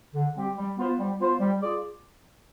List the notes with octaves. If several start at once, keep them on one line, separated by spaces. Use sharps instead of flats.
D3
G3 C4 G4
G3
B3 F4 C5
G3
B3 F4 C5
G3
F4 G#4 D5